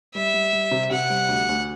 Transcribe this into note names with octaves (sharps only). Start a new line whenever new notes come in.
G3 E5
G3
G3
C3
C3 F#5
G3
D2
D2